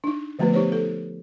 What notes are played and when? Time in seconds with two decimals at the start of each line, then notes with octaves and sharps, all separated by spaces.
0.04 D4 D#4
0.39 D3 F3 A3 B3 F#4 B4
0.53 B3 D#4 G4 C5 C#5
0.72 D#4 A4